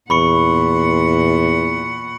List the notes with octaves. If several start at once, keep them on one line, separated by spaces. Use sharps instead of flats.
E2 A#2 F#5 B5 C#6 C#7